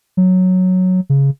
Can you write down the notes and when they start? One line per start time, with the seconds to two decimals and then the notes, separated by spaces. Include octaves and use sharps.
0.17 F#3
1.10 C#3